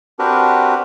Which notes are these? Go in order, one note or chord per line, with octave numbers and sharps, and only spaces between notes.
C4 D4 F#4 G4 A#4 B4